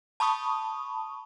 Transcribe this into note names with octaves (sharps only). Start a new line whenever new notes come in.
A5 B5 C#6 D#6